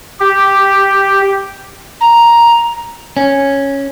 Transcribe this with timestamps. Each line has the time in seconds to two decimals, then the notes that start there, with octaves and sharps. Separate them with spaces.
0.20 G4
2.01 A#5
3.17 C#4